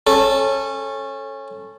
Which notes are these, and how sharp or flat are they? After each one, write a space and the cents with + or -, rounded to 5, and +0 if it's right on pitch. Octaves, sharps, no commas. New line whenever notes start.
C#4 -20 A4 +0